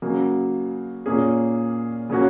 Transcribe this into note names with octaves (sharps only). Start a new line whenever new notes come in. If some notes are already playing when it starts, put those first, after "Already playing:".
C#3 F#3 A#3 F#4
A#2 A#3 C#4 G#4
C#3 A#3 C#4 F#4